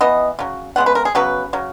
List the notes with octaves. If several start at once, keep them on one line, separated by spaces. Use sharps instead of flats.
E3 B3 D#5
C#3 F#3
C#3 G#3 B3 F#5
B4
A#4
G#4
C#3 F#3 B3 B4
C#3 F#3